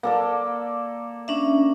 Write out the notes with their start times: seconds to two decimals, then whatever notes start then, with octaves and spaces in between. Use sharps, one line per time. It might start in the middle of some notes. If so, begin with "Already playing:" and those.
0.03 A#3 A4 D5
1.28 C#4 D4 E5